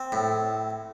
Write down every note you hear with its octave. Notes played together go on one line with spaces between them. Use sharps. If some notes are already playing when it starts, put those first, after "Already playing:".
Already playing: C4
A2